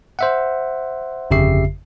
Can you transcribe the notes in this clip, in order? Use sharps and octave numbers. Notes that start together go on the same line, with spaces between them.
C5 E5 F#5
G1 F2 C#3 G4 E5 C7